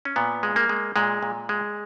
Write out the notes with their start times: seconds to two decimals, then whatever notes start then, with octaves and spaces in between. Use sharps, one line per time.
0.05 C#4
0.16 A#2 B3
0.43 G#3
0.56 A#3
0.69 G#3
0.96 A#2 G#3
1.23 A#2
1.49 G#3